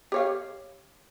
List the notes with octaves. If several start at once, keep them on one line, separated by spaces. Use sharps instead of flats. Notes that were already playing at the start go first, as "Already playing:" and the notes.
G4 C#5 F5